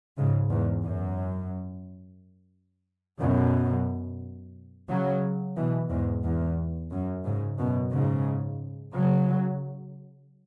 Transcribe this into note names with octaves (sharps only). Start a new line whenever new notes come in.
G#2 C#3
E2 G#2
F#2
F#2 B2
C#3 F#3
B2 E3
E2 G#2
E2
F#2
G#2 C#3
F#2 B2
G#2 C#3
C#3 F#3